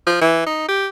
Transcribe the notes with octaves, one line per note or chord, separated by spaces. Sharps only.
F3
E3
D#4
G4